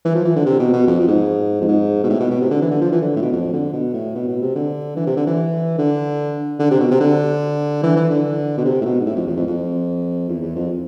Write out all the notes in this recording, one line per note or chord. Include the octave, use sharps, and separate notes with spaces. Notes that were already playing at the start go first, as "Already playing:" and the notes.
E3
F3
E3
D3
C3
B2
B2
F2
F2
G#2
F2
G#2
B2
A2
B2
B2
C3
D3
E3
D3
F3
E3
D3
A2
B2
F2
D3
B2
A2
B2
B2
C3
D3
E3
C3
D3
E3
D3
D3
C3
B2
C3
D3
E3
E3
D3
B2
C3
A2
B2
G#2
A2
F2
E2
F2
F2
E2
E2
F2